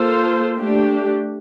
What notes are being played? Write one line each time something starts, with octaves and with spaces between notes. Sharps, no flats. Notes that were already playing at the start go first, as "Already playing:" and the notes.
Already playing: A#3 F4 A4 C5
A3 D4 G4